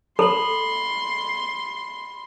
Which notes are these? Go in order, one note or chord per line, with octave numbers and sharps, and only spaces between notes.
A4 B5 C6 F#7